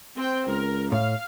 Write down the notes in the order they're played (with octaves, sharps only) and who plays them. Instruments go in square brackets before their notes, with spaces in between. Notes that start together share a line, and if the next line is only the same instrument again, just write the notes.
[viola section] C4 G5
[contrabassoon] C#2 [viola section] A#4
[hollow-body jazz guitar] A2 [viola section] F5